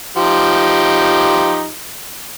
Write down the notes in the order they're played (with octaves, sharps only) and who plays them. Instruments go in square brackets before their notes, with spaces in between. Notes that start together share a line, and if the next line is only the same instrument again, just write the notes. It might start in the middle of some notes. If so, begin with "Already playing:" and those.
[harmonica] F3 D#4 G4